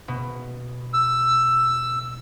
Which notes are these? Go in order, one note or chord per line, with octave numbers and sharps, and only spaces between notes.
B2
E6